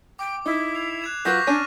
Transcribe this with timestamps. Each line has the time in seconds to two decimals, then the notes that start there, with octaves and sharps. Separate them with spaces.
0.19 G5 D6
0.46 D#4 E4 D6
0.75 C7 F7
1.02 F#6 G#6 E7
1.25 F#3 F4 B4 C#6 G6 A#6 B6
1.47 C#4 D4 C#5 F6 G#6 D#7